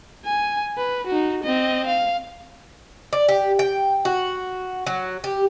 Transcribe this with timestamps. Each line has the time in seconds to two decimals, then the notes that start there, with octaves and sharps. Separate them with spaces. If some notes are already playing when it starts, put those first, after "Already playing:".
0.25 G#5
0.77 B4
1.07 D#4 F#4
1.44 C4 D#5
1.87 F5
3.13 D5
3.29 G4
3.59 G5
4.05 F#4
4.86 F#3
5.24 G4